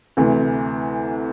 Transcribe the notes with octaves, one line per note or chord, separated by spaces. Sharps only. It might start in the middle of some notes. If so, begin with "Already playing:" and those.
D2 C3 E3